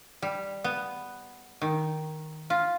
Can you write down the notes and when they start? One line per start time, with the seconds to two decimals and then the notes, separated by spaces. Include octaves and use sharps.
0.22 G3
0.64 B3
1.61 D#3
2.50 F4